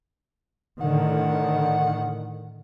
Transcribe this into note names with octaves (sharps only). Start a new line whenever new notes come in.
A2 D3 D#3 F#5